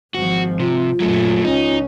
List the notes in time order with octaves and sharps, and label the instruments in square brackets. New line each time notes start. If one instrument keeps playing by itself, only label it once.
[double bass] G#1 F3 [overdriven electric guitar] F#4
[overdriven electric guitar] C3 [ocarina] F4
[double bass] F#2 A#2 [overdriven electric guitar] F#3 A3
[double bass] C#2 C#4 [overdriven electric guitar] D#4